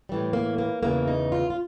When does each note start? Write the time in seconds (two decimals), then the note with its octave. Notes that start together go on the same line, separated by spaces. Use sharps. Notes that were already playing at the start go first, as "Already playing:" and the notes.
0.09 A2 E3 G3
0.33 A#3
0.58 A#3
0.83 E2 C#3 E3 A#3
1.08 D#4
1.32 F4
1.50 F4